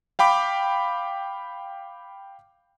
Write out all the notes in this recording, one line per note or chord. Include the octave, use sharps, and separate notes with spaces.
F5 G5 B5 D6